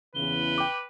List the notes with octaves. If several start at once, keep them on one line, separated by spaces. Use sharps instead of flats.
E2 C#3 E3 B4 G7
G5 D6